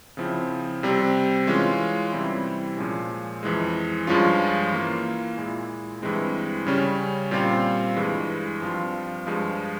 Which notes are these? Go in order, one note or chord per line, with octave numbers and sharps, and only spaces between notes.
C#3 F3 C4 E4
C3 G3 C4
E3 G#3 C#4 F4
C3 E3 G3 C4 E4
A#2 F3 G#3 C#4
F2 E3 G#3
G2 F3 G#3 C#4 F4
E3 A#3 F4
A#2 G#3 E4
G2 E3 G#3 C4 E4
C#3 G3 C#4
A#2 G3 C4 F4
G2 E3 G#3
G2 F3 C4 F4
G2 F3 G#3